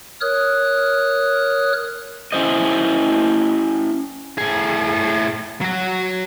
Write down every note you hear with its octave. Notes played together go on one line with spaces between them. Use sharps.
A#4 C#5 D#6 F6 F#6
C#4 E4 C5 D#5
A2 G#4
F#3 F#4